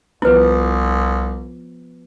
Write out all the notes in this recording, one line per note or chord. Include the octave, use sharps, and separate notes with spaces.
C2 F3 B3 E4 B4